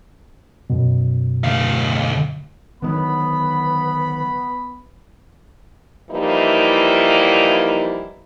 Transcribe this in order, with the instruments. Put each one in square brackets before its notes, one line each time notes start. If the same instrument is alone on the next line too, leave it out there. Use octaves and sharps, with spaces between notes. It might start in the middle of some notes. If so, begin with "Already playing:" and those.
[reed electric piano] F#2 B2
[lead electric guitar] D2 F5
[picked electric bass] D3 D#3 F#3 [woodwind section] B3 [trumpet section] B5
[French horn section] E3 F3 G3 A#3 D#4 E4